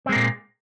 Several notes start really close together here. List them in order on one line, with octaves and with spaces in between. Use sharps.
C4 G#3 A#3 A#2